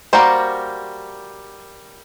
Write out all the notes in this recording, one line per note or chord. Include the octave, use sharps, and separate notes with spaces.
G3 A#3 F#4 A#4 C5